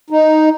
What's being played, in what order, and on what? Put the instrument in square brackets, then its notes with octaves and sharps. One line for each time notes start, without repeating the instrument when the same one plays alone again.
[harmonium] D#4